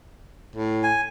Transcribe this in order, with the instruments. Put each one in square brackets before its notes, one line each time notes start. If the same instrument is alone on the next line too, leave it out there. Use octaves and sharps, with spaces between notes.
[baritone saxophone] A2
[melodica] G#5